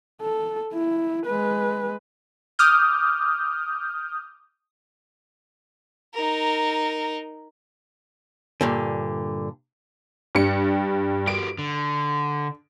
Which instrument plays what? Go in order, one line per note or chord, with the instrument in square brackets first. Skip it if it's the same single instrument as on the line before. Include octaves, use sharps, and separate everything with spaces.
[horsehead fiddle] A4
E4
G#3 B4
[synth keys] D6 D#6 F6 G6
[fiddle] D#4 A#4
[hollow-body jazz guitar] G2 A#2 D3
[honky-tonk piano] G2 G3 C#7
[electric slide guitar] F#4 G4 A#4 [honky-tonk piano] D7
[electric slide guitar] D3